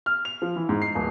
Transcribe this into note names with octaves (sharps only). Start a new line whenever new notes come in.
F6
F7
F3
E3
G#2
C7
D1